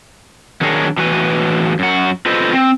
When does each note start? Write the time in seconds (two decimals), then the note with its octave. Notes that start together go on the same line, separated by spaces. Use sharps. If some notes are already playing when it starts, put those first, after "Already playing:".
0.61 D#3 F#3 D4 G#4 A#4 C#5
0.98 A2 E3 F#4 B4 G#5
1.79 F#2 F#4
2.26 F4 A4 B4 C5 D#5
2.53 C4